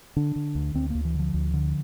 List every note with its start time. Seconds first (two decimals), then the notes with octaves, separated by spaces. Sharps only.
0.16 D3 D4
0.36 D3
0.55 D2
0.74 D2 C4
0.90 D2 A#3
1.05 E3
1.14 D3 F3
1.34 D2
1.54 D3